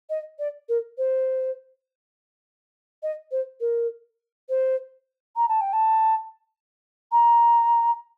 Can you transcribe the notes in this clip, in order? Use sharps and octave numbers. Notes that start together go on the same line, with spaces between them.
D#5
D5
A#4
C5
D#5
C5
A#4
C5
A#5
A5
G5
A5
A#5